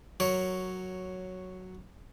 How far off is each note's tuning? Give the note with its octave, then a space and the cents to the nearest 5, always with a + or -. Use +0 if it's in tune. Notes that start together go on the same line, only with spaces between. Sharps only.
F#3 +0 A#4 +0 C#5 +0